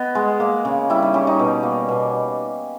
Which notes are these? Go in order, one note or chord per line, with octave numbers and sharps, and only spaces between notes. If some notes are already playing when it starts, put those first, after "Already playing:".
Already playing: B3 D#5
G#3
A#3
C#3
G3 E4
D#4
G3 C#4
D#4
B2
A#3
B2